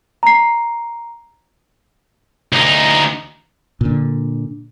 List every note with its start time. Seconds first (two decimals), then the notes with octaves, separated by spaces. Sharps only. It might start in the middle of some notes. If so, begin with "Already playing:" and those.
0.23 A#5 C7
2.53 D2 D#4
3.81 A#2 D3